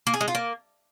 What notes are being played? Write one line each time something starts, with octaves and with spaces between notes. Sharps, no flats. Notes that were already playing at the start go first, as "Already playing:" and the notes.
A#3
G#4
G#3
F4
A#3